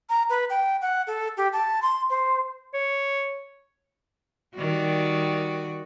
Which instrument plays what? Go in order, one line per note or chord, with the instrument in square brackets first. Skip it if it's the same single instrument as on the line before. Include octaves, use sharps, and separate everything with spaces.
[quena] A#5
B4
G5
F#5
A4
G4
A5
C6
C5
[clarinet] C#5
[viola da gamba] D#3 G3 F#4